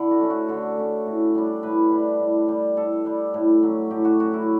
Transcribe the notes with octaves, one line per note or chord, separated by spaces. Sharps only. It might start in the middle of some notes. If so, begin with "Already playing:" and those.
Already playing: D3 E4
F#4
A3 C#4
F#4
D3 A4
A3 C#4
A2
G3 D4
A2 B4
G3 D4
A2
G3 D4
A2 A4
G3 D4
A2
F#3 C#4
A2 G4
F#4
F#3 C#4 F#4
E4